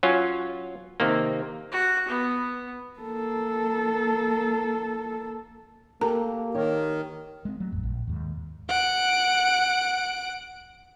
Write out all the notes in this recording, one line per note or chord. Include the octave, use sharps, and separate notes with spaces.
F#3 C#4 F4
C3 D#3 A#3
F#4
B3
A#3 A4
A#3 G4 A4 A#4 A#5
D#3 G4 C#5
G#3 C4
F#3 A3
A1 F2
A#1
D#2 G#2
F#5 D7